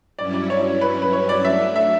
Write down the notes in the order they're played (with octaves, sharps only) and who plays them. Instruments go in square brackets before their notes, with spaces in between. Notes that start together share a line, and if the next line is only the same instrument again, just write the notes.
[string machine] G2 F#3 C#4 E4 [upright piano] D5
[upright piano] D5
C#5
B4
B4
C#5
D5
[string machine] F#3 A3 D4 [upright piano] E5
[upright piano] E5